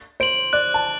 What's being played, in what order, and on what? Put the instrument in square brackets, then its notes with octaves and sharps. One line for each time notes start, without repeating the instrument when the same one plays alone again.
[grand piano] C5 [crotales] D7 F#7
[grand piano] D5 [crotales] F#6
[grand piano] A5